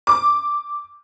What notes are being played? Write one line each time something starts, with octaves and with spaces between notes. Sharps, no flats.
D6